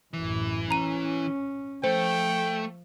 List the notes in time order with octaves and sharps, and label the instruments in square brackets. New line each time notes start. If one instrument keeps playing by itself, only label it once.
[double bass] A1 F#2 [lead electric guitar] E3
[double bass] C#4 [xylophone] A#5 D#7
[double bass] F3 [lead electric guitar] A3 [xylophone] C5 [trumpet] G5